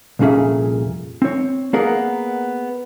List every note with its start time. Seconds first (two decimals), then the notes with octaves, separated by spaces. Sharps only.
0.19 C2 F2 A#2 C#4 G#4 E5
1.22 C4 C#5
1.73 A#3 B3 G#4 A#4 D5 F#5